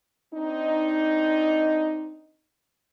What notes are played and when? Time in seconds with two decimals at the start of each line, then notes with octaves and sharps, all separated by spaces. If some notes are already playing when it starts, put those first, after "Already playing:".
0.33 C4 D4 D#4